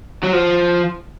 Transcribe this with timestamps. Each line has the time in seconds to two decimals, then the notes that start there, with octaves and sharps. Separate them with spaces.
0.24 F#3
0.33 F3